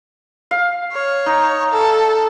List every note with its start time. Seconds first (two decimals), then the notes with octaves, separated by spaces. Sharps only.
0.51 F5
0.93 C#5
1.26 D#4
1.72 A4